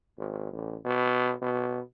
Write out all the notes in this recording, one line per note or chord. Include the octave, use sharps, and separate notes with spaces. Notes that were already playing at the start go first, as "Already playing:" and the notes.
G#1
A1
B2
B2